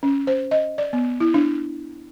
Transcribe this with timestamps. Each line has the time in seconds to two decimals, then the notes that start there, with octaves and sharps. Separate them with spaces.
0.03 C#4
0.27 C5
0.51 D#5
0.78 D5
0.93 B3
1.20 E4
1.34 D4